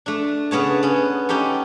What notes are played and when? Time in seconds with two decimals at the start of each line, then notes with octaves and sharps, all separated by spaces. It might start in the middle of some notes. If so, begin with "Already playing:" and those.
0.06 A3 D4
0.51 C#3 B3 C#5 A5
0.83 B3 C#4
1.29 C#4 D#4 G4 A4